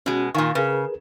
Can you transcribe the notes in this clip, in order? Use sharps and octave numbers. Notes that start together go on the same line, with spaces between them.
B2 G#3 C#4 F#4
A#2 D#3 F5 G#5 C#6
C#3 G#4 A#4 B4